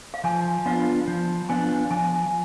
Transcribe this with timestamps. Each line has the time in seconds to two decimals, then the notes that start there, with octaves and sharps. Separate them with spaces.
0.14 F5
0.24 F3 G#5
0.66 B3 D4 F4 F5
1.07 F3
1.49 B3 D4 F4 G#5
1.91 F3 G#5